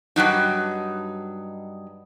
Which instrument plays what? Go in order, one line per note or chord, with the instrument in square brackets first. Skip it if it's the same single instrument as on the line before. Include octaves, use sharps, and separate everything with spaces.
[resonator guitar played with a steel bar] G2 C#3 F#3 D#4